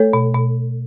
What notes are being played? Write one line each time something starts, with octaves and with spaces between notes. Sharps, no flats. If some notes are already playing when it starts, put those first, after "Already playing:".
Already playing: A3 A4 C#5
B2
B2